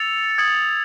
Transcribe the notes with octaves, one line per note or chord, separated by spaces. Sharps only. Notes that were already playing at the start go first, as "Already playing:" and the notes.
Already playing: E6 A6 C#7 F7
D#6 G#6 C#7 F#7